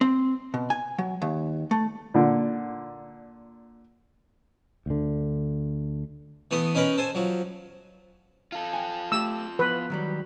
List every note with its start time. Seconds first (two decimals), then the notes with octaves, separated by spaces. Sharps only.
0.01 C4
0.54 B2
0.70 G#5
0.98 F#3
1.22 D#2
1.71 A3
2.14 A#2 D3
4.86 D2 D3
6.51 E3 A3 B3 D#6
6.75 C#4 D#4 A#4 B4
6.98 A4 C5 G#5
7.15 F3 F#3
8.52 F4 A4
8.73 G5 G#5
9.12 A3 G4 E6
9.59 F3 B3 B4
9.90 D#3 F#3 G3